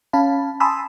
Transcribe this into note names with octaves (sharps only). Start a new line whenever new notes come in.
C#4 F5 A5 B5
G#5 A5 B5 C6 D#6 E6